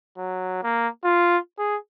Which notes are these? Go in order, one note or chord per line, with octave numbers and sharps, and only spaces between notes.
F#3
A#3
F4
G#4